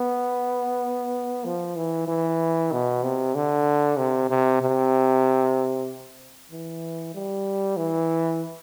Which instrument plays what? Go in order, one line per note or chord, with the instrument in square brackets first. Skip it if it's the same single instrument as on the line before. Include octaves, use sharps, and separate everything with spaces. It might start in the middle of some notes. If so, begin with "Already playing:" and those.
Already playing: [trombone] B3
F3
E3
E3
B2
C3
D3
C3
C3
C3
E3
G3
E3